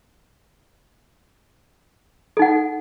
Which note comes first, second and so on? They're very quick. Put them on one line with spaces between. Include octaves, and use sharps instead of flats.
A4 D#4 F#5